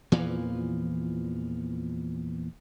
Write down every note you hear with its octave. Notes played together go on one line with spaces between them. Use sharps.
E2 A#2 E3 F3